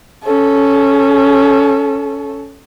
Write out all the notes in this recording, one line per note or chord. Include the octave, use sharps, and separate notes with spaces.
C#4 A4